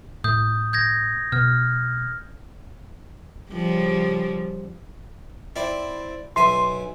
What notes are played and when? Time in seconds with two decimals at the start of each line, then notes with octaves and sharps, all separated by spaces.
0.24 A2 D#6 G6
0.73 G6 G#6 A#6
1.32 B2 F6
3.52 C#3 F3 G3
5.56 C4 E4 D5
6.36 B1 E5 G#5 C6